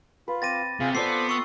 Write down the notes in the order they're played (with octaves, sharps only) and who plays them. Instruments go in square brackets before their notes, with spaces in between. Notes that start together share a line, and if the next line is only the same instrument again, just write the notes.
[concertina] F4 [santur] B4
[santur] C4 D6 [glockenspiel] A6 A#6 D#7
[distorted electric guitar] C3 [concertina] F4 G#4 F5
[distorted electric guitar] B3 [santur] F4 D5 [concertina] A4 C5 D6 [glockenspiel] C7
[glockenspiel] C#6 E6